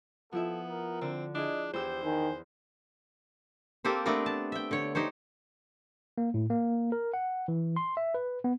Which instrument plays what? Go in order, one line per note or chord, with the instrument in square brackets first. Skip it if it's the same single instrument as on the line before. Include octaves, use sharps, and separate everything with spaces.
[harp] F3 E4 E5 [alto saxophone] B3 [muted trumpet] A4
[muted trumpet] A#4
[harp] D3 [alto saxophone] C4
[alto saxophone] D4 [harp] E4 G#4 [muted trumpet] D#5
[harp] E2 E6 G6 [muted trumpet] G4 [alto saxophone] C5
[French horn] D#3 [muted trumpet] G#5
[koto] A#3 C4 G4 A4 C5
A3 B3 C4 D4 A#4
A5
E5 G5
D3 C#5
D#4 G4 C5 C#5
[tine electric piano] A#3
A2
A#3
A#4
F#5
E3
C6
E5
B4
B3